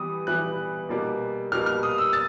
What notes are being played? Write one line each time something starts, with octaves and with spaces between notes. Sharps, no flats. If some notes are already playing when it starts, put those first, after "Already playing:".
Already playing: E3 G3 B3 D#6
E3 G3 B3 F#6
B2 G3 A#3
B2 G3 A#3 F6
F6
D#6
E6
A6